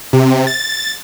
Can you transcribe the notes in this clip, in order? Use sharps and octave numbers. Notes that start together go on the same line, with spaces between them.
C3
A6